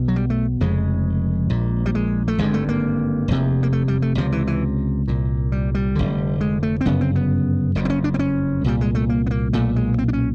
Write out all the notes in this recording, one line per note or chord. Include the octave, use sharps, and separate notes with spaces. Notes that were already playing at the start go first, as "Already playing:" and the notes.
Already playing: B1 B2
F#3
G3
A3
F1 F2 C#3 G#3
A#1 A#2
G3
G#3
A3
G#1 G2 D3 G#3
A3
A#3
F1 E2 C3
A#3
A3
G3
A3
C#2 C3 F3
E3
E3
C2 A#2
G3
G3
F1 D#2 D3
G#3
A3
C4
G1 F#2 C#3 B3
C4
B3
F#1 F2 C#3
C4
C#4
D4
C4
C#4
C2 A#2 G3
G#3
A3
A#3
B3
A#3
B1 A#2 A3
G#3
C4
D4
C#4